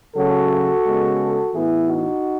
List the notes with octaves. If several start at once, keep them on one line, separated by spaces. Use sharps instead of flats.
C#3 F#3 A3 F#4 A4
C#3 G#3 B3
A2 E3 B3 E4 G#4
D#4 F#4